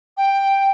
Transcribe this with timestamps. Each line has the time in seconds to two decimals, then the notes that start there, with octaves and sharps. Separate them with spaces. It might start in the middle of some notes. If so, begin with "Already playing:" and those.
0.17 G5